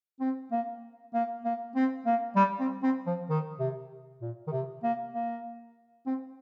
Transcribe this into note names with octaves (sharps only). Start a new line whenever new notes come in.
C4
A#3
A#3
A#3
C4
A#3
G3
C4
C4
F3
D#3
C3
A#2
D#3
C3
A#3
A#3
C4